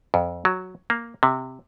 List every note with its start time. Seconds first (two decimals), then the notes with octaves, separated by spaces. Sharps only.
0.14 F2
0.45 F#3
0.90 A#3
1.23 C3